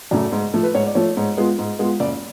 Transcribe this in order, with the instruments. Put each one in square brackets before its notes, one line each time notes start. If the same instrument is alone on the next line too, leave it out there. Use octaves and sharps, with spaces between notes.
[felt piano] F#2 C#3 F#3 A3 D5
G#2
F3 A3
B4
G#2 C#5
D5
F3 A3 C#5
G#2
G#3 B3 F4
G#2
G#3 B3 F4
F#1 D5